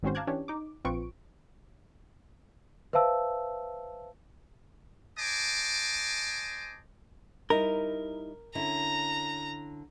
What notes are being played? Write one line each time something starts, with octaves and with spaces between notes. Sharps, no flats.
G#1 G#2 C4 C#4 F#4 C5
F5 A5 A#5 D6 F#6 G#6
E3 C#4 D4 G4 C#5
D#4 D6
A#1 C4 F4 B4 C#6 D7
B4 C5 E5 F5 A5 E6
C5 D#5 G#5 A5 D6
G3 D#4 E4 A#4
D3 C#4 E4 A#5